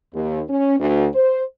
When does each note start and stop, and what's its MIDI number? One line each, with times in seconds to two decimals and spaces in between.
0.14 0.41 39
0.50 0.79 61
0.80 1.07 38
1.14 1.42 72